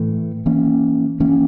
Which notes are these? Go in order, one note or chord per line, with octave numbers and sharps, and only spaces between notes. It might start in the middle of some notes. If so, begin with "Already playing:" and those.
Already playing: A2 E3 A3
E3 A#3 C#4
E3 A#3 C#4